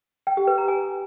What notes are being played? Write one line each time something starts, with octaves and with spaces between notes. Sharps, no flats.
G5
G4
B4
A#5
G#5